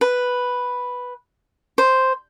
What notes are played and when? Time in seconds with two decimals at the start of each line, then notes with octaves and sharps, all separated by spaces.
0.01 B4
1.78 C5